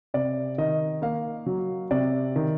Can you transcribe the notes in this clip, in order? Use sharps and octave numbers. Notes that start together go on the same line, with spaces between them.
C3 D5
D#3 D#5
A#3 F5
F#3
C3 D5
D#3